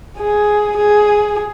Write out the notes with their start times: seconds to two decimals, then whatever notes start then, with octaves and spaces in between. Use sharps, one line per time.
0.19 G#4
0.77 G#4